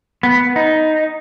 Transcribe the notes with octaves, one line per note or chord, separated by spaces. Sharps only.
B3
D#4